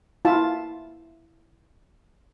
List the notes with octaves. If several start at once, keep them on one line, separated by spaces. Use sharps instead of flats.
E4 F4 E5 A5